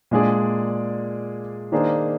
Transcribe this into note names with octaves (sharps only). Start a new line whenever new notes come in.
A#2 G#3 D4 G#4 D5
D#3 A#3 D4 G#4 C5